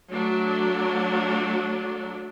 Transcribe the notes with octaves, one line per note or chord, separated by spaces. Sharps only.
F#3 A3 D4